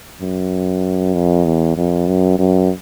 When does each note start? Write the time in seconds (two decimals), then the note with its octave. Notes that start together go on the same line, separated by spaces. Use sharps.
0.21 F#2
1.14 F2
1.45 E2
1.76 F2
2.07 F#2
2.39 F#2